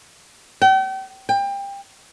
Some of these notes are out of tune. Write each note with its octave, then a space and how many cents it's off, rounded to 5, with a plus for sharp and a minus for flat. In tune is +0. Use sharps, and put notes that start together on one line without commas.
G5 -40
G5 +25